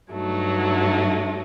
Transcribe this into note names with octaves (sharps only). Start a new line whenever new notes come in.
G2 F#3 A3 D#4